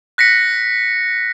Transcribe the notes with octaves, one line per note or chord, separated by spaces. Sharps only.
F#6 A#6 B6 C#7